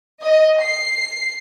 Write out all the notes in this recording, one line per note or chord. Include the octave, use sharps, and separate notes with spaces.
D#5
C7